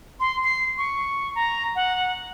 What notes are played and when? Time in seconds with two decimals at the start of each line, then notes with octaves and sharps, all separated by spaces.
0.20 C6
0.44 C7
0.78 C#6
1.35 A#5
1.75 F#5